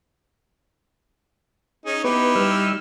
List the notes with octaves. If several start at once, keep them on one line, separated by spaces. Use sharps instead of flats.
C#4 D#4 G#4
B3 D#4 E4 G4 B4
G3 E6 F6